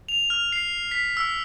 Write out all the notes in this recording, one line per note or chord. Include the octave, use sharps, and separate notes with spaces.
F7
F6
C7
B6
E6